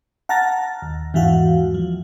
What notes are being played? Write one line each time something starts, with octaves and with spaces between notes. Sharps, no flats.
F#5 A5 A#5 F6 A6 A#6
D#2
E2 G#2 E3 F#4 F5 F#5
F3